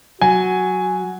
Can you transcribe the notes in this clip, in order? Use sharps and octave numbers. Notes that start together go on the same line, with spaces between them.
F#3 F#4 G#5